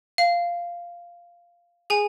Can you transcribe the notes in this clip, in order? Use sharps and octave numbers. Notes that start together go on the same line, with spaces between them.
F5
G#4 G#5